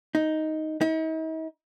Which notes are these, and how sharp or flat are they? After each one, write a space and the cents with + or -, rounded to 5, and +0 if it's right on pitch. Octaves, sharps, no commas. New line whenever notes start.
D#4 +5
D#4 +45